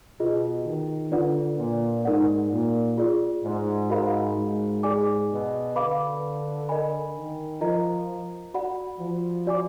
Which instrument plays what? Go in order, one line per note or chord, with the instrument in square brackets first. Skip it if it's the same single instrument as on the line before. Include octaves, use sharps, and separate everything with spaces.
[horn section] B2 [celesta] F4 G#4 D#5
[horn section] D#3
[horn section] D3 [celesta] D4 F4 B4 D5 F#5
[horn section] A#2
[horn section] G#2 [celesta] D#4 A#4 D5 F#5
[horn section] A#2
[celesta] F4 G#4 D5
[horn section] G#2
[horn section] G#2 [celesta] F#4 A#4 F5 B5
[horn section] G#2
[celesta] G#4 D5 G#5 D6
[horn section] B2
[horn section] D3 [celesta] B4 F5 B5 D6
[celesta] A#4 D#5 G#5 B5
[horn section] D#3
[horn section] F3 [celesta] F4 A#4 D#5 A#5
[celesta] F#4 D5 F#5 B5
[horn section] F3
[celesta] F#4 D5 G#5 D6